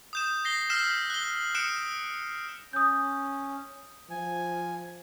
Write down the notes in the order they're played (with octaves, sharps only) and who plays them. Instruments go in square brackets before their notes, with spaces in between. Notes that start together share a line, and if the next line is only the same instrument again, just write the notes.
[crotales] D#6 G6 E7
A#6 C7 G7
E6 F6 B6 C7 E7
F#6 G7
D#6 F#6 C#7 D7 E7
[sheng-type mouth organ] C#4 [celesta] D#6 G6
[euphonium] F3 [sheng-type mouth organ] G#5